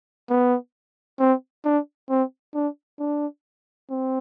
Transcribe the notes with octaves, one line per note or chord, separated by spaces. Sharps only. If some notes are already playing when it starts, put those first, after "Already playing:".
B3
C4
D4
C4
D4
D4
C4